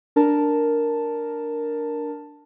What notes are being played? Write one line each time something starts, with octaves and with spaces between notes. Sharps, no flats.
D4 A#4 A5